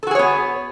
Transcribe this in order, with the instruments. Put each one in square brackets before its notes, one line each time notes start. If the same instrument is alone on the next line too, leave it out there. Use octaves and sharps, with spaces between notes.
[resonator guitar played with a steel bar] A4
F#4
G#4
C#5
B3